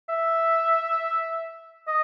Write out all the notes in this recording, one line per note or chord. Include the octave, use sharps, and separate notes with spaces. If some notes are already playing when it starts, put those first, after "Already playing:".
E5
D#5